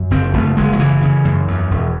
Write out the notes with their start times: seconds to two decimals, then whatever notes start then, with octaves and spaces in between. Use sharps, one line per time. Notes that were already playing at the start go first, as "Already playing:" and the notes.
Already playing: F#2
0.11 F#1 C4
0.33 F#1 A3
0.57 F#1 G#3
0.73 F#3
0.79 C#3 E3
1.02 C#3
1.25 F#2
1.48 E2
1.71 E1